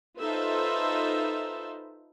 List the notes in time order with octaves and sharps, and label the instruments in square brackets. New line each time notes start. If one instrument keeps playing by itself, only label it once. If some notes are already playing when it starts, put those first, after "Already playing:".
[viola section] D#4 F4 A4 B4 C5 E5